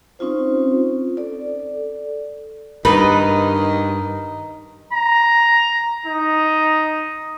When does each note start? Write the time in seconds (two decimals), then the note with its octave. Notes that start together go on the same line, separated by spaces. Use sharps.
0.19 C4 C#4 D#4 F4 C5
1.17 A4 D5
2.85 G2 D#3 D#4 B4
4.93 A#5
6.06 D#4